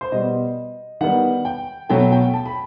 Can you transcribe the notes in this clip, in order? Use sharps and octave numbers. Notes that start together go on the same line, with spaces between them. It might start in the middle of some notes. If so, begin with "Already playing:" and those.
C5
B2 G3 B3 D#5
D#3 G3 B3 F#5
G5
B2 F#3 A3 G5
G5
A5
B5